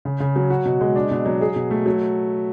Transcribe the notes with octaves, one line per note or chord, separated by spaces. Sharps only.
C#3
C#3
F#3
F#4
B2
G#3
D4
B2
F#3
G#4
B2
A3
F#3